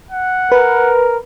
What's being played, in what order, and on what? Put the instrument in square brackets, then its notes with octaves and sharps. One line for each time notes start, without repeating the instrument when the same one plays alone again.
[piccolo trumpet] F#5
[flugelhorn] A#4 [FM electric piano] B4